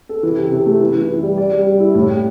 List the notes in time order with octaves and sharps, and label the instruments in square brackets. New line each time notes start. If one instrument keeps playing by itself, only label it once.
[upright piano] A4
E3
C3
C3
A3
E3
E3
E3
G3
D5
G3
G3
E4
A2
G4